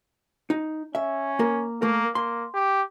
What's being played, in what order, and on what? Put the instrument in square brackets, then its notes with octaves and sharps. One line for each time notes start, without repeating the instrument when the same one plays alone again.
[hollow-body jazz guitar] D#4
[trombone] C#4 [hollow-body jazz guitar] E5
[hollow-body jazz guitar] A#3 A#4
[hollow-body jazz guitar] A3 A#4 [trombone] A#3
[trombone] A#3 [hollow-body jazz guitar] C6
[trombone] G4